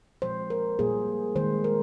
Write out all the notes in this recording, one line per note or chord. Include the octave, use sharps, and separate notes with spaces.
A#2 F3 G#3 C5
A#4
A#2 G3 A#3 G#4
D#3 G#3 C5
A#4